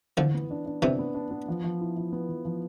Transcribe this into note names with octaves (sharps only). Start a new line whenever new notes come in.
D3 E3 F3
B3
D4
D4
C3 E3 D4
B3
D4
B3
F3
F3
E4
F3
B3
F3
F3